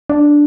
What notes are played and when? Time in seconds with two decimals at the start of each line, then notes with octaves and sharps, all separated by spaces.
0.10 D4